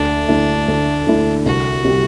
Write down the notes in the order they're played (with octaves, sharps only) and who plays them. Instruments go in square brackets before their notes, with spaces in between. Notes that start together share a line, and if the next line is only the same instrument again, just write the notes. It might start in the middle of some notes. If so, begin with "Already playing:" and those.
Already playing: [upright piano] D2 [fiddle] D4
[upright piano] D3 A3 E4
D2
D3 A3 E4
[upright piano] C2 [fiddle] F#4
[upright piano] C3 G3 C4 G4